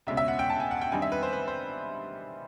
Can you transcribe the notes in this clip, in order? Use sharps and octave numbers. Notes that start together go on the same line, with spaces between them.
C#2 B2 G#3 C#4 E5
E5
F#5
G5
A5
G#5
F#5
G5
G2 D#3 G3 C4 D#4 G#5
E5
B4
C5
B4
C5